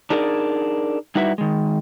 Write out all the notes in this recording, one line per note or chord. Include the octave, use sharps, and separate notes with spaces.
D4 D#4 G#4 A#4 D5
G3 D#4 E4 F#4 B4 E5
D#3 G#3